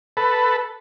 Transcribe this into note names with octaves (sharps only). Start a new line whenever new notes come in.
A4 B4